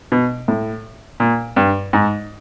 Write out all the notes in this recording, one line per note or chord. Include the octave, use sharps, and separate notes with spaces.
B2
A2
A#2
G2
G#2